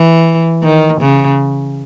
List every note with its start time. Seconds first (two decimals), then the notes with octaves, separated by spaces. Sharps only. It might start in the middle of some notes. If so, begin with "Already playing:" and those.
Already playing: E3
0.63 D#3
1.01 C#3